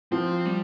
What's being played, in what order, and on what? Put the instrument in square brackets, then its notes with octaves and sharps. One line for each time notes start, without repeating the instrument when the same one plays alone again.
[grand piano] F3 [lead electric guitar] C4
[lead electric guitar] G3